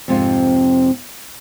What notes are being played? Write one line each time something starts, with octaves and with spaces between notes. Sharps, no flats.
F2 G#2 C3 C4 F4